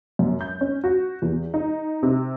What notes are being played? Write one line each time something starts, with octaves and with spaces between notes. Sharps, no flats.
F#2
G6
C#4
F#4
E2
D#4
C3